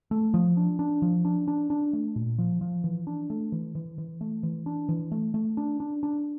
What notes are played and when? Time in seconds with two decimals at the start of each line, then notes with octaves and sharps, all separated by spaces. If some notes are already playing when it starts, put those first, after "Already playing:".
0.11 A3
0.34 F3
0.57 D4
0.79 D4
1.02 F3
1.25 D4
1.48 D4
1.70 D4
1.93 A3
2.16 A#2
2.38 F3
2.61 F3
2.84 E3
3.07 D4
3.30 A3
3.52 E3
3.75 E3
3.98 E3
4.21 A3
4.43 E3
4.66 D4
4.89 E3
5.12 A3
5.34 A3
5.57 D4
5.80 D4
6.03 D4